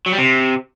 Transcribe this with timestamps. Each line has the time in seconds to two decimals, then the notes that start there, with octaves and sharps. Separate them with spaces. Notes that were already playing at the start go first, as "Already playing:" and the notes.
0.06 F#3
0.12 G3
0.18 C3